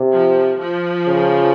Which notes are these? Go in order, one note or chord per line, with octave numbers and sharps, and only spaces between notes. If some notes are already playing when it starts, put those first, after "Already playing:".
Already playing: C3
F3
F3
C#3